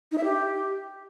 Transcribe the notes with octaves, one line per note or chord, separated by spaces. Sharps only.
D#4
E5
G4